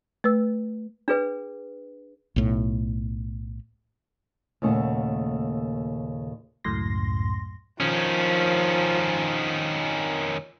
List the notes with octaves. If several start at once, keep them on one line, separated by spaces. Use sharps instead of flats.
A3 B4 E6
D4 G#4 B4
B1 A2
D#2 A#2 C#3 A3 F#5
C#2 F#2 A2 C6 A#6
D#3 F3 C#4